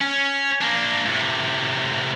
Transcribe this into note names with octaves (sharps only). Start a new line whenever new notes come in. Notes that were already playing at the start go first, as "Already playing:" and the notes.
C#4
A#3 D4
A2 C3